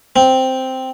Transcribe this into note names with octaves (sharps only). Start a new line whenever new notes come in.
C4